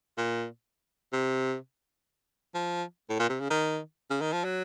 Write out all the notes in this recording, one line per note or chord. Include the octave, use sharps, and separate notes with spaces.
A#2
C3
F3
A2
A#2
C3
C#3
D#3
C#3
D#3
F3
F#3